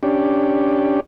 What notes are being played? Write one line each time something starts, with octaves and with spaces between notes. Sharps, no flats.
C#4 D4 G4